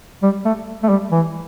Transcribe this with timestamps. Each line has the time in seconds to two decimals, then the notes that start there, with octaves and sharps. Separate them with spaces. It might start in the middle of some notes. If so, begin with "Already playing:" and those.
0.23 G3
0.45 A3
0.83 A3
0.89 G3
1.12 E3